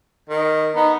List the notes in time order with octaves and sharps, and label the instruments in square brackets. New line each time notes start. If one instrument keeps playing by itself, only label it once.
[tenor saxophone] D#3
[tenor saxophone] B3 [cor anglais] D#4